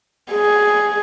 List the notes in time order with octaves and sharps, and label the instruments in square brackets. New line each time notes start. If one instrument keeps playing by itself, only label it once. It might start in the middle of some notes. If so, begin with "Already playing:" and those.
[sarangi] G#4